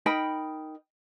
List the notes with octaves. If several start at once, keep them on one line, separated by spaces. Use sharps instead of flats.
D#4 A#4 G5 B5